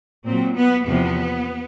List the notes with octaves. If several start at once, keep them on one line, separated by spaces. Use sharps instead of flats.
A#2 F#3 C4
B3
E2 C3 F3 B3